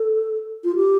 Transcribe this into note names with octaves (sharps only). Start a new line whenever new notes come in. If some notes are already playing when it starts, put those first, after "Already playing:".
Already playing: A4
F4
G4